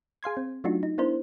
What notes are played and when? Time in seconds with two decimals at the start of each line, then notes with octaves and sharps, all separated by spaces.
0.23 G#4 F5 C6 G#6
0.37 C4
0.64 F#3 A3 D4 D#4 F4 F#4
0.83 D#4
0.98 B3 D4 E4 A#4 C5